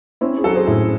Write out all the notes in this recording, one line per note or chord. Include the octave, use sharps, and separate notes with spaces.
C4 C#4 E4
G#4
F#3 F#4 A4
G#4 C5
A2 E4 G#4